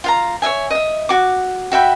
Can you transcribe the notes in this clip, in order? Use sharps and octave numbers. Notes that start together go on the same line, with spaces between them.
F4 F5 A#5
C#5 D#5 E5 G#5
D#5 E5
F#4 D6
F#4 E5 G5 B5